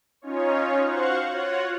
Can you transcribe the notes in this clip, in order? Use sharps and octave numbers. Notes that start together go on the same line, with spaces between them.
C#4 D#4 F4 C#5
F#4 C5 F5 F#5 C#6
F4 F#4 C#5 F#5